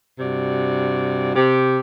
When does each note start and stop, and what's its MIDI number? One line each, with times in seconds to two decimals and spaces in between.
0.19 1.34 43
0.19 1.34 48
0.19 1.34 66
0.19 1.34 74
1.36 1.80 48
1.36 1.80 67